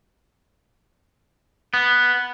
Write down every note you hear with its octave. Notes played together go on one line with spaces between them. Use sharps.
B3